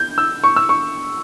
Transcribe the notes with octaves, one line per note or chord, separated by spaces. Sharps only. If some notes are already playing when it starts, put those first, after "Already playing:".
Already playing: G6
E6
C#6
E6
C#6